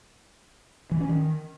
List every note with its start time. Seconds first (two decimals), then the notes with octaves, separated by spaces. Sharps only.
0.91 E3
1.00 C#4
1.09 D#3